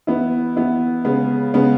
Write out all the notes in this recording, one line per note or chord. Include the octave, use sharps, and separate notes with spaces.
E3 B3 E4
E3 B3 E4
C#3 G#3 B3
C#3 G#3 B3